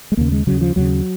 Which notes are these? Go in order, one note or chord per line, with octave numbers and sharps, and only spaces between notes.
G#3
D#2 C#3 A#3
G#3
D#2 C#3 F#3
F3
D#2 C#3 F#3